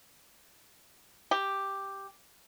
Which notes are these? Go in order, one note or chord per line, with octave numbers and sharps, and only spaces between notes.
G4